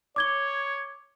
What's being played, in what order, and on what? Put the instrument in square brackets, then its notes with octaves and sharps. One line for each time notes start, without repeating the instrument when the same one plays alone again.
[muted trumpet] C#5 [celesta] D6 G#6 G7